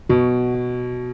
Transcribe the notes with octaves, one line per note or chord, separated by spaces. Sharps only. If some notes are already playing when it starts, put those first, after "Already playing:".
B2 F#4
F#4